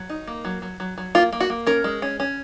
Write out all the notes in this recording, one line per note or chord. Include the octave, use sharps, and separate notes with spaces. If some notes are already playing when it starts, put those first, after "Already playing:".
Already playing: F#3
D#4
A#3
F#3
F#3
F#3
F#3
A#3 F4
A#3
F#4
A#3
C#4 A#4
G#3
C#4
C#4